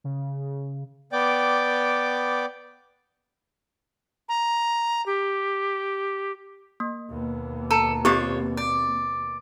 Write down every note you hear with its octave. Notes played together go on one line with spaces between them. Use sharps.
C#3
B3 D5 G5 D6
A#5
G4
A#3
D#2 B2
A4 A#5
A#3 C4 F4 G4 C5 C#5 D6
D5